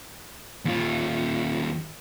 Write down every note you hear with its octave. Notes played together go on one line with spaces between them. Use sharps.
D#2 F4